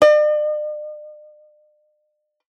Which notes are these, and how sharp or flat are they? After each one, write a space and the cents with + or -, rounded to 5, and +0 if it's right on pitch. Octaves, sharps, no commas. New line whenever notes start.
D5 +45